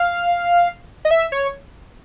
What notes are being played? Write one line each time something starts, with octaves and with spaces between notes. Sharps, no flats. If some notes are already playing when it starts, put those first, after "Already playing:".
Already playing: F5
D#5
E5
C#5